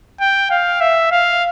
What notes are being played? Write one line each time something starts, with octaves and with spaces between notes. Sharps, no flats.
G5
F5
E5
F5